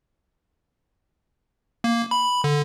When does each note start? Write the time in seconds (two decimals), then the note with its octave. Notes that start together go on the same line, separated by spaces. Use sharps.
1.84 A#3
2.11 B5
2.44 D3